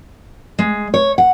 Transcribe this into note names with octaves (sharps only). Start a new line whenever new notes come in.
G#3
C#5
F#5